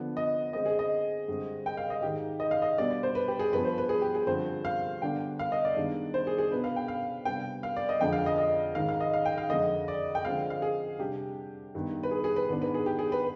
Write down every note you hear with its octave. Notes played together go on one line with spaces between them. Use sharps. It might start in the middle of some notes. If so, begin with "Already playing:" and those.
Already playing: D3 F3 B3 D4
D#5
D3 G#3 C4 D#5
G#4
D#5
G2 D3 G#3 C4
G5
F5
D#5
G#2 D#3 G#3 G4
D#5
F5
D#5
B2 G3 B3 D4 D5
D5
C5
B4
G4
G#4
G2 F3 B3 D4 B4
C5
B4
G#4
G4
G#4
G2 D3 F3 C4 C5
F5
D3 G3 B3 D4 G5
F5
D#5
D5
G2 D#3 G#3 B3 D4
C5
G#4
G#4
B2 B3 D4 B4
F5
G5
F5
C3 G3 B3 D4 G5
F5
D5
D#5
F2 D3 F3 G#3 D4 G5
F5
D#5
D#5
G#2 D#3 G#3 F5
F5
D#5
F5
G5
F5
F2 D3 G#3 D#5
D5
G5
D3 F3 G#3 C4 F5
F5
G#4
C3 G3 D4 G4
G2 D#3 B3
B4
G#4
G#4
B4
G#2 D#3 B3 D4
B4
G#4
G4
G#4
B4